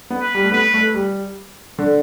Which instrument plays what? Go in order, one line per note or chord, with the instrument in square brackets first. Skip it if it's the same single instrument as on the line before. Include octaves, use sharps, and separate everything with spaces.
[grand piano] B3
[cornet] B4
[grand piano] G3
A3
[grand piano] B3 [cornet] B4
[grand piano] A3
G3
D3